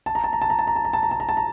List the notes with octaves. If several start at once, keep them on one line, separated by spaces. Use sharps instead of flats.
A5
A#5
A5
A#5
A5
A#5
A5
A#5
A5
A#5
A5
A#5
A5
A#5
A5
A#5